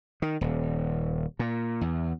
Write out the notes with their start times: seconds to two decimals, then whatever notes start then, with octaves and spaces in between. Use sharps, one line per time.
0.22 D#3
0.41 D#1
1.39 A#2
1.81 E2